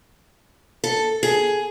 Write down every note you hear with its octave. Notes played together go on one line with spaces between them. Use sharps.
A4
G#4